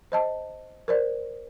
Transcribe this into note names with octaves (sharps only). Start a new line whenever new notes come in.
C5 D#5 A5
A#4 C5 D5